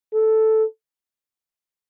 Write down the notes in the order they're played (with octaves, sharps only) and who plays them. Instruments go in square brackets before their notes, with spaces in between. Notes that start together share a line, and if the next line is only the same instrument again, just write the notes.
[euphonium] A4